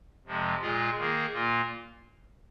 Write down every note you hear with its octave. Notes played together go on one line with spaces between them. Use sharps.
F2 C3 F3 G#3
A#2 G#3 F4 G#4
D#3 A#3 G#4
A#2 A#3 F4